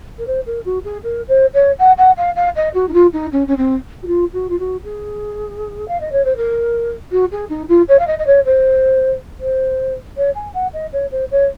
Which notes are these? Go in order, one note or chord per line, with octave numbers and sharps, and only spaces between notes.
A#4
C5
A#4
F#4
G#4
A#4
C5
C#5
F#5
F#5
F5
F5
D#5
F#4
D#4
F4
D#4
C#4
C#4
C4
F#4
F4
F#4
F4
F#4
G#4
F5
D#5
C#5
C5
A#4
F#4
G#4
D#4
F4
C#5
F5
D#5
D#5
C#5
C5
C5
C#5
G#5
F#5
D#5
C#5
C5
C#5